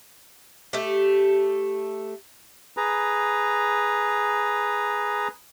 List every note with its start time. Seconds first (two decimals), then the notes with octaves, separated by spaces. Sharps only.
0.73 A3 G4
2.77 G#4 B4 A#5